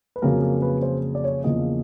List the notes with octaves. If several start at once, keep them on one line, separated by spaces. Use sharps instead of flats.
B4
F2 C#3 F#3 A#3 A#4
A#4
B4
C5
D5
C#5
E2 C#3 F3 A#3 D#5